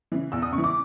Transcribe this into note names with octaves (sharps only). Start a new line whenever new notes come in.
C#3 E3
E2 E6
D#6
C#3 C#6
E3
D6